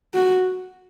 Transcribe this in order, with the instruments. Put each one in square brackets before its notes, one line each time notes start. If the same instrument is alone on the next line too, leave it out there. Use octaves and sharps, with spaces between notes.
[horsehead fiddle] F#4